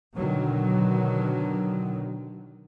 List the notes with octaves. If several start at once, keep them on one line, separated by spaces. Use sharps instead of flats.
B2 D3 D#3 F#3